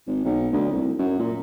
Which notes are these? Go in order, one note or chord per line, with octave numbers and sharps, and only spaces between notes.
G#1
B1
D2
C2
F#2
A#2